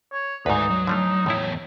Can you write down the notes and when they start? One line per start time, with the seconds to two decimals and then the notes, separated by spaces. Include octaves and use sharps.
0.13 C#5
0.46 D2 G#2 D#4 B4 G#5
0.71 F#3
0.87 D3 F3 A3 D#4
1.26 E2 A2 E4 C#5